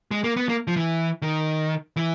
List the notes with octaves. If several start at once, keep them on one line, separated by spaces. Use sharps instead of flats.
G#3
A#3
B3
A#3
F3
E3
D#3
E3